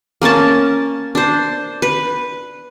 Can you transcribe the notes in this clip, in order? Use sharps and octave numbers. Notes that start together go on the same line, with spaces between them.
A#3 C#4 A#4 A5
D4 C5
B4